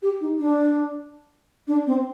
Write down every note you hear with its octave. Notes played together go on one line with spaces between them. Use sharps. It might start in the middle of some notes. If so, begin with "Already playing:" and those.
G4
D#4
D4
D4
C4